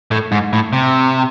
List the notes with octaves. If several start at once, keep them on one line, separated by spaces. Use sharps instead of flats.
A2
G#2
A2
C3